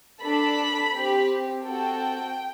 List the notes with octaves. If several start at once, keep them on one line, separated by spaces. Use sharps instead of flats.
D4 A4 B5
C4 G4
C4 F#4 A4 G5